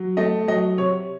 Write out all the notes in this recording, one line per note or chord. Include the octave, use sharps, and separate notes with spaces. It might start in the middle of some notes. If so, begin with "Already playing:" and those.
Already playing: F#3
A3 D#5
F#3 D#5
C3 C#5